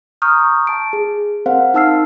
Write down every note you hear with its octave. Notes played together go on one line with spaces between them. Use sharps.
A#5 C#6 D#6 F6 G6
A5 D7
G#4
C4 A#4 C5 F5 F#5
D#4 F5 A5 E6 F6 C7